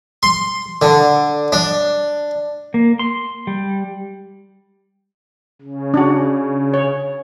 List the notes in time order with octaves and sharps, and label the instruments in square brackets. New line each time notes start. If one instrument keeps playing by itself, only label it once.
[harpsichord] C6
D3
D4
[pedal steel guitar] A#3
C6
G3
[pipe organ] C#3
[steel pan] D4 F#4
C#5